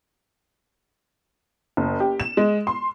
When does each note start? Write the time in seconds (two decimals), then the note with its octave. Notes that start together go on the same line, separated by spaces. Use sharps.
1.77 F#1
2.00 G4
2.20 E7
2.37 G#3
2.67 C6